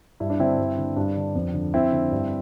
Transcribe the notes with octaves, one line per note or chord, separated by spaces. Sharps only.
G2 E4
D4
D3 C4 E4
G2
D3
G2 D4
D3
F2
D3
F2 C4 E4
D3
G2